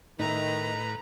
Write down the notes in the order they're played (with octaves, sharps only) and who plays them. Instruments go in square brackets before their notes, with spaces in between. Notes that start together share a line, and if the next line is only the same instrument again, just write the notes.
[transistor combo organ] A2 B4 [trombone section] D#3 [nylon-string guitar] D#4 E5 [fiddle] A#5